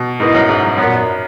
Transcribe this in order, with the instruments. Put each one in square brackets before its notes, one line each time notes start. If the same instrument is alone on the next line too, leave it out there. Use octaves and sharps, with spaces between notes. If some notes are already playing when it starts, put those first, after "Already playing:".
Already playing: [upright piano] B2
[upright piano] G#2 [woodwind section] B3 E4 A#4 D#5
[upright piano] F#2
G#2
F#2
[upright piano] F#2 [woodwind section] A#2 F#3 B3